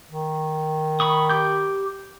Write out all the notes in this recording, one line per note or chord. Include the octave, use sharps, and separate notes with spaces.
D#3
B5 C#6 D#6
G4 D6 G6